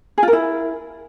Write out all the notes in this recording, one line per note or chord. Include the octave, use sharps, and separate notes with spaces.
G#4
F4
A#4
E4